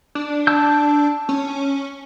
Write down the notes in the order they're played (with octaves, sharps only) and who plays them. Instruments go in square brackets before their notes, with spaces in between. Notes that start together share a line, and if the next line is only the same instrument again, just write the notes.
[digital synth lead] D4
[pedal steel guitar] A5 E6 G6
[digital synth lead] C#4